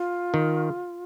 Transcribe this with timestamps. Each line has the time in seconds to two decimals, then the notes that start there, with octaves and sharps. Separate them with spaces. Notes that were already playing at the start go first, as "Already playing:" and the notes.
Already playing: F4
0.34 D#3